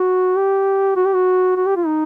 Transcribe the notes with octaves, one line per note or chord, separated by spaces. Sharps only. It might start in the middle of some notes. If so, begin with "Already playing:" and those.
Already playing: F#4
G4
F#4
G4
F#4
F#4
G4
F4
D#4